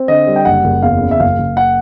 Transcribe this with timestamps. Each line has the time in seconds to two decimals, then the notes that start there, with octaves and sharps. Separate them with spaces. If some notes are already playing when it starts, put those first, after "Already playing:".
Already playing: C4
0.08 D3 D#5
0.27 G3
0.36 G5
0.45 F#1 F#5
0.64 F#1
0.83 E2 F5
1.01 C#3
1.11 E5
1.20 F#1 F5
1.38 F#1
1.57 F#5